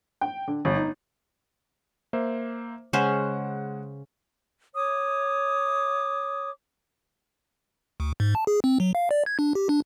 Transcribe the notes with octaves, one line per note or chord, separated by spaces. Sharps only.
G5
D3
G1
D#4
A#3 C5 E5
C#3 G#3 C#4 C5 F#5 E7
C#5 D6 D#6
D2
G#2
A5
G#4
C4
F#3
F5
D5
G#6
D4
G4
D4